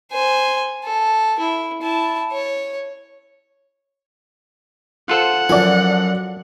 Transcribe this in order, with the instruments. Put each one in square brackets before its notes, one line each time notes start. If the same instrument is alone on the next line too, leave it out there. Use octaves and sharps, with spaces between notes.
[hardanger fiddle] C5 G#5
A4
E4
E4 A5
C#5
[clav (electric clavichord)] F4 A4 C5 [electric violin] F#5
[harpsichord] F#2 G#5 [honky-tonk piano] F3 D5